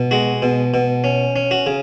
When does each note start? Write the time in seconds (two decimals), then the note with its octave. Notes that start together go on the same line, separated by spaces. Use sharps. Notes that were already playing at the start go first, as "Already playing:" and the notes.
Already playing: B2
0.11 G#3 F#4
0.42 B2
0.74 B2
1.04 C#4
1.36 C#4
1.51 F#4
1.67 C#3